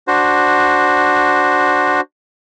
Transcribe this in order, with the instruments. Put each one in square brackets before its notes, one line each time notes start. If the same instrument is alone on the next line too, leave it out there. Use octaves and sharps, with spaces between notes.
[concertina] D4 F#4 C5